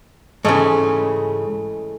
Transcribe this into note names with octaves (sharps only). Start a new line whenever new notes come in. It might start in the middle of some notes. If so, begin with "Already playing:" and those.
G#2 C#3 E3 G#3 A3